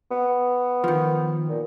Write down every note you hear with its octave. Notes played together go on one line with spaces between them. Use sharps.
B3
D#3 F3
A#2